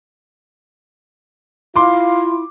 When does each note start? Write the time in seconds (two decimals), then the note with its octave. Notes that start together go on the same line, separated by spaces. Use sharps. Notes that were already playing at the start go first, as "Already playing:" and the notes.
1.76 E4 F4 F5 C6 D6